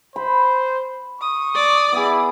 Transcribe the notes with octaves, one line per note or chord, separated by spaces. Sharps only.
C5 B5
C#6 D#6
D5
B3 E4 G#4